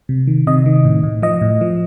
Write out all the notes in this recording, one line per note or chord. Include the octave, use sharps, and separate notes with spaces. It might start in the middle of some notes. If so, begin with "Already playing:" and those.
C3
D#3
C3 D#5
D#3
A2
A2
F3 D#5
A2
F3